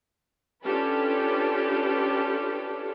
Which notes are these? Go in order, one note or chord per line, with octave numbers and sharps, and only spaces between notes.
C#4 D4 F4 G4 A4 B4